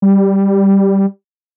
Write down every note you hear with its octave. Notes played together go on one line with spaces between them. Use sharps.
G3